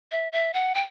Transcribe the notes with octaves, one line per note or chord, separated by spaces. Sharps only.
E5
E5
F#5
G5